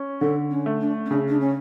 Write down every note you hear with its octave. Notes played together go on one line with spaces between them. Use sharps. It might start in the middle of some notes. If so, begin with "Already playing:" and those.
Already playing: C#4
D3 A4
C#4
A3
D4
C#4
C#3 D4
D4
C#4